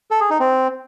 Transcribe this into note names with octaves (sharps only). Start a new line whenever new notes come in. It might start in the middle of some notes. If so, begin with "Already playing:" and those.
A4
G#4
D#4
C4